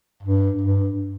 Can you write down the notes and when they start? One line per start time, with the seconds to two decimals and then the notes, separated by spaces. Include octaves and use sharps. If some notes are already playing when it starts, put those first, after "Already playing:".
0.23 G2
0.61 G2